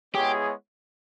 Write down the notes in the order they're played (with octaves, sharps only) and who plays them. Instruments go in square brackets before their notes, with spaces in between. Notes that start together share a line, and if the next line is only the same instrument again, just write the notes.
[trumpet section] G#3 B3 E4 G#4 C#5 [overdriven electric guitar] G4